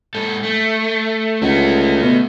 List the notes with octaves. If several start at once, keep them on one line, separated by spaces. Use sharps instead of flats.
G#2 A4
A3
C#2 A3 F#4
B2